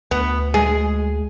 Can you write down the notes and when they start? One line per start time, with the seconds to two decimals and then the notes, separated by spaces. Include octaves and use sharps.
0.11 D2 B3
0.54 G#3 G#4